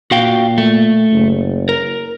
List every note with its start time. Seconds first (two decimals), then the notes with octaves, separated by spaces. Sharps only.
0.11 A#2 F#4 F5 G5
0.58 A3
1.13 F#1
1.69 A#4